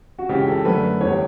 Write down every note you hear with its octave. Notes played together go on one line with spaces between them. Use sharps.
F#4
C#2 C#3 E3 G4
A4
F#2 D3 A3 B4
E2 D3 G3 C#5